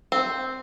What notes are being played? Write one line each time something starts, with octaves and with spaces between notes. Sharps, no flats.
C4